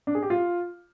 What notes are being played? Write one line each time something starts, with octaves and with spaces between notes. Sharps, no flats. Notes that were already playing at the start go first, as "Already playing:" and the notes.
D4
G#4
G4
F4